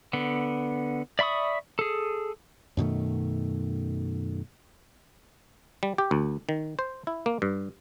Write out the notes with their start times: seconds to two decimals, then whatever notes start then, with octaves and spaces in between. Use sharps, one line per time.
0.13 D3 B3
1.19 D5 E5 B5 C#6 D#6
1.79 G#4 A4
2.77 F#2 B2 D#3 A3
5.83 G3
5.98 G4
6.11 D2
6.49 D#3
6.79 C5
7.07 E4
7.26 A#3
7.42 G2